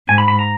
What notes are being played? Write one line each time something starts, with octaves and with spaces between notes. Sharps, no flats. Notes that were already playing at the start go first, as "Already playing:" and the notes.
G#2 G#5
B5
B5
A#5